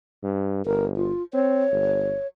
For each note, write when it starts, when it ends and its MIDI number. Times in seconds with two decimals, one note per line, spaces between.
0.23 0.65 43
0.66 1.11 31
0.66 0.85 70
0.96 1.23 65
1.34 1.65 60
1.34 2.27 73
1.71 2.15 31